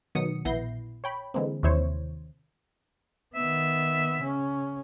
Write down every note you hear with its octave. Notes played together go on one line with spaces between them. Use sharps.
B2 D#3 F#3 B3 D#6 C#7
A#1 B3 E4 G6 A#6 C7
C#5 G5 B5
D3 E3 G#3 A#3 C4
D#2 C3 E4 C5 C#5
D#3 B3 E5
C#3 C#4